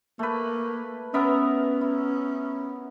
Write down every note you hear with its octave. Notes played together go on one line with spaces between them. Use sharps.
A3 A#3 B4
B3 C#4 A#4 E5
E4